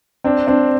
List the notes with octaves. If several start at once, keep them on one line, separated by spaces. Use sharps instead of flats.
C4 D4
C4 D4